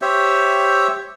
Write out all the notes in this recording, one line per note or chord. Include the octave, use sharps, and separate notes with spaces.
G4 C5 C#5 E5